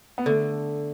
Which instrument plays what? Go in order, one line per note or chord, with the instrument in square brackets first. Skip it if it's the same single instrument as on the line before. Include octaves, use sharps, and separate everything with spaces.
[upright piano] B3
[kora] D3 [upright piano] A3